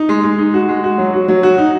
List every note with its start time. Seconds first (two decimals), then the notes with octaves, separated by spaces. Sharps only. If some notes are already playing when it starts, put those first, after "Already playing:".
Already playing: D#4
0.09 G#3
0.24 G#3
0.39 D#4
0.54 F#4
0.69 G#3
0.84 F#4
0.98 F#3
1.13 F#4
1.28 F#3
1.43 F#4
1.58 D#4